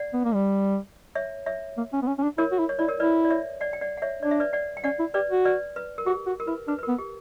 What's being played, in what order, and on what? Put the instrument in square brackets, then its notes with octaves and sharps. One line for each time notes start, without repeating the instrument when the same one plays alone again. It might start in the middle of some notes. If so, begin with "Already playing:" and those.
Already playing: [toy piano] D5 F#5
[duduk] B3
A#3
G3
[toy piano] C#5 E5
C#5 E5
[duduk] A#3
C#4
B3
C#4
C#4
D4
[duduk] E4 [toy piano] A#4 C#5
[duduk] F#4
E4
[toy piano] C#5
[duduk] E4 [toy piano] D5
[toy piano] A#4 C#5
[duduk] E4 [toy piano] B4 D5
[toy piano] D5
C#5 E5
D5 F#5
G5
D5 F#5
F#5
C#5 E5
[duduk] D4 [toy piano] D5
[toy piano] E5
B4 D5
D5 F#5
G5
[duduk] C#4 [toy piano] D5 F#5
[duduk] E4
[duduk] G4 [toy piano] B4 D5
[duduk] F#4
[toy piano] B4 D5
B4
A#4
[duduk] F#4 [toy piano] G4
[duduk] F#4
[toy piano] A#4
[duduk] E4 [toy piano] B4
[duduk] D4 [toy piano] B4
[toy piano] B4
A#4
[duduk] B3
[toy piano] G4